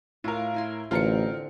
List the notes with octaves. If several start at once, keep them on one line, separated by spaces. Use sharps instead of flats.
A2 F4 A#4 F5
E4 G#5 C6
A1 D3 C4 D4 F4 A#4 C#7